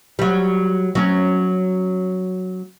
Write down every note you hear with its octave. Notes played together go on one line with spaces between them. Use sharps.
F#3 G3
F#3 C#4